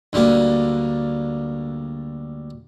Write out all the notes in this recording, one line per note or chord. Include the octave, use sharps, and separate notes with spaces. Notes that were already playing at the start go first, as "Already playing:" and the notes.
D2 D3 G3 A#3